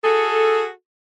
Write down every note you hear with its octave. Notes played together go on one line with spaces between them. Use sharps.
F#4 G#4 A4